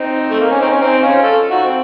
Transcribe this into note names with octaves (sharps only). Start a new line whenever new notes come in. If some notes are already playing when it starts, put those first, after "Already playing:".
Already playing: C4 D#4
A3
A#3
C#4
C4 D#4
C#4
C4 D#4
C#4 F4
F4 A4
D#4 F#4
C4